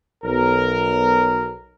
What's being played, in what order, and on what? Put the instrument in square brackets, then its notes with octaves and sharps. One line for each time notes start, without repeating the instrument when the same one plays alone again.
[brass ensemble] B1 A#4